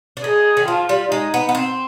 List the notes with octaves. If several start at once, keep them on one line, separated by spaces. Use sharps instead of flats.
D4
D#4 G#4
D#3
F3 F4
G3
G#3 D#4
B3
B3
C4